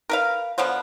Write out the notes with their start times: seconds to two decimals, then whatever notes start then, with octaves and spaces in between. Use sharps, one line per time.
0.09 A#4 B4 F5
0.58 D3 F3 B3 C5